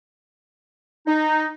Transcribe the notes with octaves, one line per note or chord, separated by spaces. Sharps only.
D#4